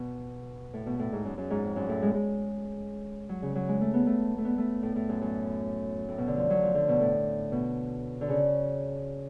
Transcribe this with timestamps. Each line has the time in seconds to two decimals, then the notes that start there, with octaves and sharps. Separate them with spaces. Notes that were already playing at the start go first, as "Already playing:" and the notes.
Already playing: B2
0.74 A2
0.86 B2
0.99 A2
1.12 G#2
1.25 F#2
1.38 F#2
1.50 G#2
1.63 F2
1.76 F#2
1.89 A2
2.02 G#3
2.14 G#3
3.29 F#3
3.42 C#3
3.55 F#3
3.69 G#3
3.81 A3
3.94 B3
4.07 A3
4.38 A3
4.45 B3
4.58 A3
4.83 A2
4.96 A2
5.09 F#2
5.21 F#2
6.09 A2
6.18 B2
6.27 D3
6.37 F3
6.50 F#3
6.63 F3
6.75 D3
6.88 B2
7.01 A2
7.52 B2
8.21 D3
8.29 C#3